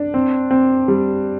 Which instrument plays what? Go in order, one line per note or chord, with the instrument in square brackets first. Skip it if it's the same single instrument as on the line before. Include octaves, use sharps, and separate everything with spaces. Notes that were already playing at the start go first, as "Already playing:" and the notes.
Already playing: [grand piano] D4
C4
C4
G3